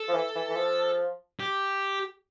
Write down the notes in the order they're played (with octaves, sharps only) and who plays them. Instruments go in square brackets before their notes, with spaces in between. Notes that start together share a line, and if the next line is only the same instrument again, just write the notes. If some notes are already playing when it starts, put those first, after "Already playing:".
Already playing: [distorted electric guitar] A4
[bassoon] F3
E3
E3
E3
F3
[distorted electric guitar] G4